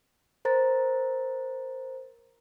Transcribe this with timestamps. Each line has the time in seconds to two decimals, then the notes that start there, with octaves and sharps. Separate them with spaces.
0.45 A#4 C5 A#5 A6